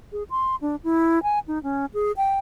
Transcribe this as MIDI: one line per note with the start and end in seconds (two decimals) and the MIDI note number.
0.12 0.23 68
0.30 0.56 84
0.61 0.76 62
0.84 1.22 64
1.23 1.39 80
1.48 1.61 63
1.63 1.86 61
1.94 2.12 68
2.17 2.39 79